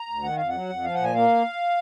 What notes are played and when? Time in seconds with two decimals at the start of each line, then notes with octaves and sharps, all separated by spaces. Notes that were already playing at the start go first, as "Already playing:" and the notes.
Already playing: A#5
0.09 D2
0.23 D#3 F#5
0.37 F2 F5
0.49 F#3 F#5
0.70 F2
0.84 F3 F5
0.94 A#2 F#5
1.04 G#5
1.14 A#3 F5